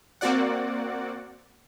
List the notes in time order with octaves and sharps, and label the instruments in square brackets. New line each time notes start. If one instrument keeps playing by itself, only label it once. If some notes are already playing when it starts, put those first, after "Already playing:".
[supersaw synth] A#3 C4 F#4 D5 F#5